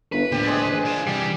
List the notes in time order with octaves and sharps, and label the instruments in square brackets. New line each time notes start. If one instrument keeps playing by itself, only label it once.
[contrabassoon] G1 [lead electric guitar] B4
[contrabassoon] A#1 [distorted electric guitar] A2 D3 [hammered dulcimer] G4
[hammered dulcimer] G#3 G#4 D5
[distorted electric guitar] D4 F4
[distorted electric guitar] C3 E3 [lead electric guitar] G3